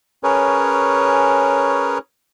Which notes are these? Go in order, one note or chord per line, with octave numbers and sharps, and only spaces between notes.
C#4 G#4 A#4 B4 C#5